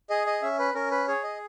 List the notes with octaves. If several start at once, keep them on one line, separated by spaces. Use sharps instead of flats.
G#4 D#5
D#5
C#4 E5
B4
C#4 A#4
B4
G#4 C#5
D#5